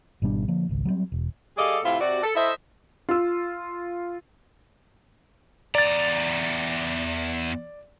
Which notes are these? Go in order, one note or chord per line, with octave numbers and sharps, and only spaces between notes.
G#1 B2 G3 D4
D3 F3 A#3
G#1 C#2
F#3 G3 A3 C4
E1
G3 G#4 A4 D5 D#5 F5
A2 C3 E4 F4
C3 F#4 D5
A4
E4 A4 C5 D#5 E5
F4 E6
E2 D5 A#5 A6